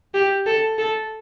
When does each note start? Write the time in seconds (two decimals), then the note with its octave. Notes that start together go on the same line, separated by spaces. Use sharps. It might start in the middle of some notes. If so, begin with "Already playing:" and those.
0.14 G4
0.46 A4
0.79 A4